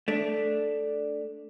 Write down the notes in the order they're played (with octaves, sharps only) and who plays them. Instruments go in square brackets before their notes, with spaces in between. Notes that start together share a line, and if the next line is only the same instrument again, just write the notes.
[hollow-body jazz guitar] A3 D4